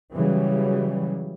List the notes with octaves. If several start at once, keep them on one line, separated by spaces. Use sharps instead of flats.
C#3 E3 F#3 G3